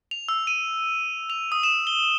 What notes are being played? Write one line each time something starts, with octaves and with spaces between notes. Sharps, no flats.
F7
E6
D#7
F7
D#6
E7
G7